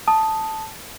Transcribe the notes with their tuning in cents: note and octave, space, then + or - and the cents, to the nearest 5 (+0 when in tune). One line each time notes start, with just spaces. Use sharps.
A5 +0 D#6 +0